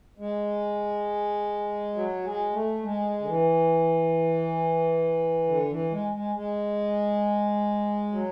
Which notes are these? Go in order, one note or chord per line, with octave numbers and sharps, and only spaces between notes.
G#3
F#3
G#3
A3
G#3
D3
E3
D3
E3
G#3
G#3
G#3
F#3